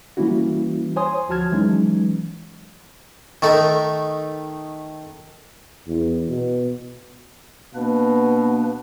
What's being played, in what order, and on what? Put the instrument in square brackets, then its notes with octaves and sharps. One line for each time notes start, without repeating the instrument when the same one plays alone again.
[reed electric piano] E3 G3 A#3 C#4 E4 F#4
C5 C#5 G#5 C6 D#6
D2 F3 F#4 A5 F6 G#6
E3 F#3 G#3 C#4 D#4
[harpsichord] D#3 A3 D#4
[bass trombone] E2
B2
[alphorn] B2 [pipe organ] A#3 D4 B4